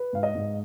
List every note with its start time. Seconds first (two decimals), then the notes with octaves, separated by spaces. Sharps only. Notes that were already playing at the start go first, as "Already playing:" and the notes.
Already playing: B4
0.13 G#2 F5
0.23 D#5
0.35 G#2